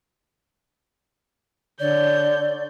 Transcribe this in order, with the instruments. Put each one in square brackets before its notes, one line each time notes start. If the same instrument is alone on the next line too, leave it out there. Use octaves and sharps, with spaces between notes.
[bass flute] D3 [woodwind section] C#5 [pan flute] D5 [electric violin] G6